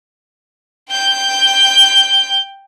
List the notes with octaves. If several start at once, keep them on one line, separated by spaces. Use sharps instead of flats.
G5 G6